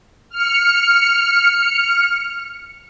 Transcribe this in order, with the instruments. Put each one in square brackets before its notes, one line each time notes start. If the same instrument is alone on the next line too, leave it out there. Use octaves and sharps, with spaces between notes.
[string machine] F6 C#7